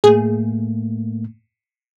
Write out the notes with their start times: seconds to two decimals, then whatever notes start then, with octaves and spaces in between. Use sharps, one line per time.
0.04 A2 A3 A#3 G#4